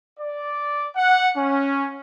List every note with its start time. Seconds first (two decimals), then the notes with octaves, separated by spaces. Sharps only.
0.19 D5
0.96 F#5
1.37 C#4